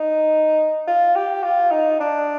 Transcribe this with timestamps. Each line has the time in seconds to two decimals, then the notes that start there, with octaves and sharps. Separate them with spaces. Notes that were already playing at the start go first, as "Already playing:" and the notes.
Already playing: D#4
0.87 F4
1.16 G4
1.43 F4
1.71 D#4
2.00 D4